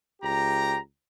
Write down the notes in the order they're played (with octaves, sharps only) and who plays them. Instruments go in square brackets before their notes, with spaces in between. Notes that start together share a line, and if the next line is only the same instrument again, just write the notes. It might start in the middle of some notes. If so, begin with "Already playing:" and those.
[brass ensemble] C#2 G4 A#5